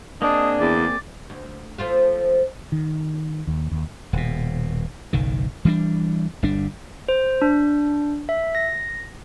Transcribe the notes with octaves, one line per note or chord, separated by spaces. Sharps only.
A#3 C4 D4 G#4 D#5
E2 D5
D2
F3 A3 F4
D#3
D#2
D#2
D#1 B2
F#1 B1 D#3
E3 G3 B3 D4
G1 G3 D4
C5
D4
E5
A#6